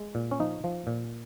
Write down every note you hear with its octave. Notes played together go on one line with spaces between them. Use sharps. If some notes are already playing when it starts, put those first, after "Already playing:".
Already playing: G#3
A#2
C#4
F3 D#4
F3
A#2